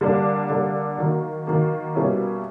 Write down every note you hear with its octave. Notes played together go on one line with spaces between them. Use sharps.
D3 G3 A#3 D4
D3 G3 A#3 D4
D#3 F#3 A#3
D#3 F#3 A#3
B2 G3 A#3 C#4 E4